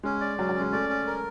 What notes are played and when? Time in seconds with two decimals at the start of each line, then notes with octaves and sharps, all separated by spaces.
0.03 G#3 C#4
0.21 D5
0.38 F#3 C#4
0.49 F#3
0.55 C#4
0.60 G#3
0.73 A3 D5
0.89 C#4
1.07 A#4